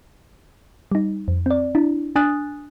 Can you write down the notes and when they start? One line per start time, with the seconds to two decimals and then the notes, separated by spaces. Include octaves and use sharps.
0.92 G3 D#4
1.28 F2
1.46 C4 D5
1.75 D4 E4
2.16 D4 G#5 D#6 F#6 A6